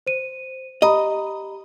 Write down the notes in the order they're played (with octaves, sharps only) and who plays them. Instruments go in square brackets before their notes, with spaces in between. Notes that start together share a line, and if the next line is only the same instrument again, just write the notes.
[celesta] C5 D#7
[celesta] G4 A#5 B5 [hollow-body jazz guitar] D#5